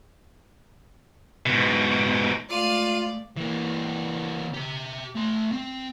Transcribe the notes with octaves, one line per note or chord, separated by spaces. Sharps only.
G#2 B2
G#3 A3 F4 D5 F5 D#7
E3 A#3
G4 E5
A3 C6
C4